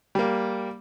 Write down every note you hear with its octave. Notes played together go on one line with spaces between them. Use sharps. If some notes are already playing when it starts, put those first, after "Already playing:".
G3 A#3